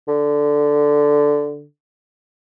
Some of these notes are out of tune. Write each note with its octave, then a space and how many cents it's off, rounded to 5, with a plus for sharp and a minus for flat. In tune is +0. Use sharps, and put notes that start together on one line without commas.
D3 +0